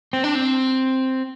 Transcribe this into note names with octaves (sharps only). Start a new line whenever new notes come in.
C4
D4
C4